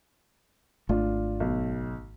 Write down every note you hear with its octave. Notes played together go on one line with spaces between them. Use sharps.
G#1 A3 D4 F4
B1